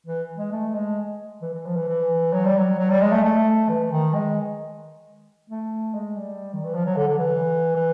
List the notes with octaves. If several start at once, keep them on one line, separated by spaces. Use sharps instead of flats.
E3
G#3
A3
G#3
E3
E3
F3
E3
E3
F#3
G3
F#3
F#3
G3
G#3
A3
A3
E3
D#3
G#3
A3
G#3
G3
D#3
E3
F3
F#3
D3
D3
E3
E3